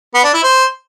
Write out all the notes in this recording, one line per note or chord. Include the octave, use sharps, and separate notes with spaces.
B3
D4
E4
C5